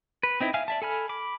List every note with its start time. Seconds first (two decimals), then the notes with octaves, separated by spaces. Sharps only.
0.23 B4
0.40 C4 D#4 E4
0.54 E5 F5 G#5 F6
0.68 D5 E5 A5
0.82 A4 G#5 B5 F6
1.09 B5 D6